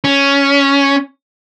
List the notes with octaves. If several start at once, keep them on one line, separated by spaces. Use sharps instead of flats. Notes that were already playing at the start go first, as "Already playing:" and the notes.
C#4